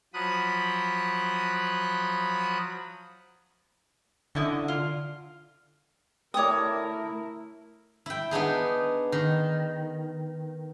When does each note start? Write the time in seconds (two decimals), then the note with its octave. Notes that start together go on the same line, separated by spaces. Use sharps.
0.14 F3 F#3 B5 D#6 F#6
4.35 D3 C#4 E4 D#5
4.68 F4
6.34 A3 E4 G4 A#4 C#5 D5 D#6
8.06 E4 G5
8.31 B3 D4 D#4 G#4
9.12 D#3